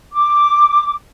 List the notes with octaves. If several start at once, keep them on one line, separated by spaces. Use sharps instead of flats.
D6